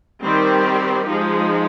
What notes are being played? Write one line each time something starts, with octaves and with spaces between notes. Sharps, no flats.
D#3 G3 C4 G4
F3 G#3 D#4